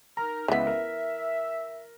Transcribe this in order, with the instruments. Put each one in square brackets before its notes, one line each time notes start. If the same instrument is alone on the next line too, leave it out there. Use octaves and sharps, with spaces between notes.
[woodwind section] D#4 A#4 [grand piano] A#5
[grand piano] C#2 B6 [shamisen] E3 B3 [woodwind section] E5
[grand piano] A#4